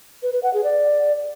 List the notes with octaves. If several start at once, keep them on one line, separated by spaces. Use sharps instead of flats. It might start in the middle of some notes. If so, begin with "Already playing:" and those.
B4
B4
F#5
G#4
D5